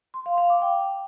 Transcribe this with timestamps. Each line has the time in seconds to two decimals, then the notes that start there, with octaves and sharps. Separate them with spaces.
0.14 C6
0.26 F5
0.38 F5
0.50 D6
0.62 G5